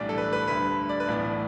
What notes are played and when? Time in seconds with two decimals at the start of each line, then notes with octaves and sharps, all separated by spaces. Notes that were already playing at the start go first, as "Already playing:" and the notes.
Already playing: B1 A2 E3 G3 D4 D5
0.09 A4
0.18 B4
0.33 B4
0.48 D2 D3 G3 B4
0.89 D5
1.00 B4
1.08 B1 A2 E3 B3 D5